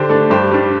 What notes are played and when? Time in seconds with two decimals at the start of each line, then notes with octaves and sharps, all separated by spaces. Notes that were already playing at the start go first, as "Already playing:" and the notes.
Already playing: D3 G4 C5
0.09 A3 D4
0.30 G2 G4 C5
0.51 G3 D4